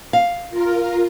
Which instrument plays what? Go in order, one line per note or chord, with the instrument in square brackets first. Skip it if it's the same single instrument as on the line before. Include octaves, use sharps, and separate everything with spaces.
[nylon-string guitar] F5
[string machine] F4 A#4